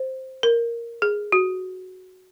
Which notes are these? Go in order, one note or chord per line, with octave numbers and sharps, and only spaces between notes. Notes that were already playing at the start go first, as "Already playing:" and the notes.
Already playing: C5
A#4
G#4
F#4